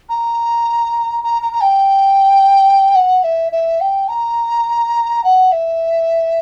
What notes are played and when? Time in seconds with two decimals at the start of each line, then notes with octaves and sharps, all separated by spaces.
0.09 A#5
1.23 A#5
1.42 A#5
1.53 A#5
1.62 G5
2.95 F#5
3.23 E5
3.52 E5
3.80 G5
4.08 A#5
5.24 F#5
5.52 E5